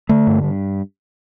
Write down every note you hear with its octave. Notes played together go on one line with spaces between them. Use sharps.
D3 A3
G2
G2